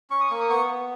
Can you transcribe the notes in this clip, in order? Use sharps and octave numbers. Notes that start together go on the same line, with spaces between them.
C#4 C#6
D#6
A#3 C#6
D#6
B3 C#6
B3